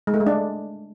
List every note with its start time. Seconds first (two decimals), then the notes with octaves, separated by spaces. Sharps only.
0.07 G#3
0.14 A3
0.20 G#3
0.27 D4